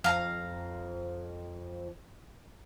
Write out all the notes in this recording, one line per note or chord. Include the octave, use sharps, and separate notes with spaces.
F2 F5 A#5